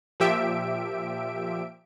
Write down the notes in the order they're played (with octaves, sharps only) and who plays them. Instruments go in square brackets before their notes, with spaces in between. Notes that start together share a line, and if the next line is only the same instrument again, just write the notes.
[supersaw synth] A#2 F3 G4 E5 D7